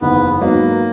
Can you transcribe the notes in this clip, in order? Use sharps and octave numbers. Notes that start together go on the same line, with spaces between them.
F#1 E2 D#3 B3
G#2 F#3 A#3 B3 D#4